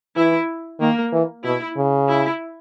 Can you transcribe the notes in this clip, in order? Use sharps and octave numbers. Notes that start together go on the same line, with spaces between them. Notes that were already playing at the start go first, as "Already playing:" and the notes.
E3 E4
D#3 A#3
E3
B2 E4
C#3
E4